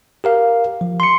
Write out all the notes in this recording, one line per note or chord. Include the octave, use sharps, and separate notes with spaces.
G4 A#4 F5
F3
C6 C#7